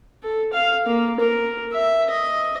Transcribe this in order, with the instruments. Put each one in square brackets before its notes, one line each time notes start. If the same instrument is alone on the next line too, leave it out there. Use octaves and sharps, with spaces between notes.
[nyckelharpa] A4
F5
A#3
A#4
E5
D#5